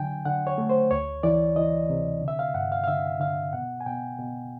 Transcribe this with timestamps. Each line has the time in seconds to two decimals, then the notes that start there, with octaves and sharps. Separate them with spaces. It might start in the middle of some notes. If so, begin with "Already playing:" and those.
Already playing: D3 F#3 G5 G#5
0.25 D3 F#5
0.47 C#5
0.58 A3
0.69 C5
0.91 D2 C#5
1.23 E3 D5
1.56 E3 D#5
1.90 C3
2.22 D3
2.28 E5
2.39 F5
2.54 G2 F#5
2.72 F5
2.84 F5
2.88 D3 E5
3.20 D3 F5
3.53 B2 F#5
3.81 G#5
3.86 B2 G5
4.19 B2